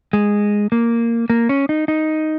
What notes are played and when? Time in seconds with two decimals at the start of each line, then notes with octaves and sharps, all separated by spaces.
0.13 G#3
0.72 A#3
1.30 A#3
1.49 C#4
1.69 D#4
1.88 D#4